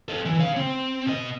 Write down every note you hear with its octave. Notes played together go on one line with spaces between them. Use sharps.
A4 D#5
E3
C#3 F5
C4
B2 D#5